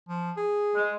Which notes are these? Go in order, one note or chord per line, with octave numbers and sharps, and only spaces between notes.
F3
G#4
G#3